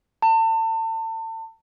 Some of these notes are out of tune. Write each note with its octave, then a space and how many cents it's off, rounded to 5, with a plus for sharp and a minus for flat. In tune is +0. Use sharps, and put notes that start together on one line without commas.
A5 +35